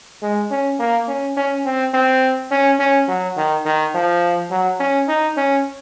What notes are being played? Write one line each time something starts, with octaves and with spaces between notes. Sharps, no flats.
G#3
C#4
A#3
C#4
C#4
C4
C4
C#4
C#4
F#3
D#3
D#3
F3
F#3
C#4
D#4
C#4